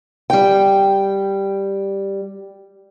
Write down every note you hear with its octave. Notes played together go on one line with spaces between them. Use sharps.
G3 G5